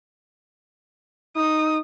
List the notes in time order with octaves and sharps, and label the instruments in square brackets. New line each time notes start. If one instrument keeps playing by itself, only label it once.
[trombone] D#4 [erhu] D#6